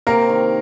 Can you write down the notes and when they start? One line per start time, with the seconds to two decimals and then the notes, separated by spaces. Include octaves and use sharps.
0.07 C3 A#3 A#4
0.29 D#3